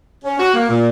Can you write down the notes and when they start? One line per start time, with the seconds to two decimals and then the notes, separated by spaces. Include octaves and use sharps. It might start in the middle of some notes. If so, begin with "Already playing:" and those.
0.24 C#4
0.39 F#4
0.54 A#3
0.69 A#2